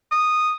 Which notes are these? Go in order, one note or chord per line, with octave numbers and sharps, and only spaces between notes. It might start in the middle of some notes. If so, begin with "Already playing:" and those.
D#6